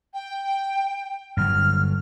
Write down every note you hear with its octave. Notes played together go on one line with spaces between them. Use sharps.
G5
G2 D3 F#3 F6